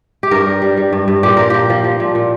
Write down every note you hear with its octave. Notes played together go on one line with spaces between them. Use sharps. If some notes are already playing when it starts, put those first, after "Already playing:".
G4
G2 A#4
G3
G3
G3
G2
G2
A#2 G4
F3 A#4
F3 G4
F3
F3
A#2
A#2